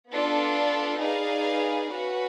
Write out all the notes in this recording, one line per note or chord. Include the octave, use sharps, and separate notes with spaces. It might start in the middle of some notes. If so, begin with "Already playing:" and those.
B3 D4 F4 A4
D#4 G#4 B4 D5 F5
C#4 F#4 B4